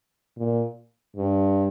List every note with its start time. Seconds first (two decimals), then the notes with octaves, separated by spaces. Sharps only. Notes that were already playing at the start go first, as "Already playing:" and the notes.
0.37 A#2
1.17 G2